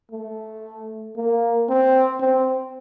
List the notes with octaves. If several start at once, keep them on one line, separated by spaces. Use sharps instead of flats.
A3
A#3
C4
C4